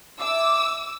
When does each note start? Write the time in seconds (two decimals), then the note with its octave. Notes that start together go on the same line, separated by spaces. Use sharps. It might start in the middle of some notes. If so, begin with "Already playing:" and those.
0.19 D4 E4 F4 D6 E6